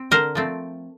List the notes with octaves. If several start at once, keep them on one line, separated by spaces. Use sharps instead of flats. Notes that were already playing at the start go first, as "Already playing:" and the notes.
Already playing: C4
D3 A#4 C5
F3 A3 C4